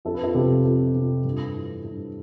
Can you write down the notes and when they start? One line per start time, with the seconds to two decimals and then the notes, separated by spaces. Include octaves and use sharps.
0.05 F2 A4
0.14 B4
0.23 F4 A4
0.34 C3 F3 G4 B4
0.65 F2 F4 A4
0.95 C3 F3
1.25 G2
1.55 E3
1.84 G2